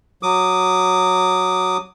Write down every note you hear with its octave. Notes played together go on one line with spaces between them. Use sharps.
F#3 D6 D#6